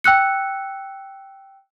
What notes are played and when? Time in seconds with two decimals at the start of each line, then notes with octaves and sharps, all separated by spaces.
0.04 G5 E6 F#6 C#7